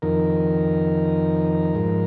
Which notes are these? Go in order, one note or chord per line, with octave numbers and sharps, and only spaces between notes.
F2 D#3 A#4
G#2 F3